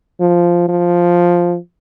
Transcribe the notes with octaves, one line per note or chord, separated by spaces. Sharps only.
F3
F3